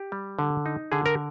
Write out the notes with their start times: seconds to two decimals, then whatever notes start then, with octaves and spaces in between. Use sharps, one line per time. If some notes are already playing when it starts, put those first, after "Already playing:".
Already playing: G4
0.12 G3
0.39 D3
0.66 D#4
0.92 D3 G#4
1.06 A#4